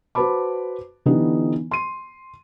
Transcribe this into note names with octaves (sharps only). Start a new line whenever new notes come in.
F#4 B4 C5 A5 B5 D6
D3 E3 B3 D#4 G4
C6 D#7